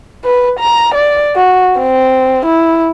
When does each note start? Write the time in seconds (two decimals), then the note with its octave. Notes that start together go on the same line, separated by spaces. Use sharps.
0.24 B4
0.59 A#5
0.95 D5
1.36 F#4
1.79 C4
2.46 E4